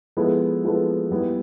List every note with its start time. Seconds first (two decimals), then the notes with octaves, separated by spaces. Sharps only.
0.17 F3 G#3 B3 E4 A4
0.64 F3 G#3 B3 E4 A4
1.11 G3 B3 E4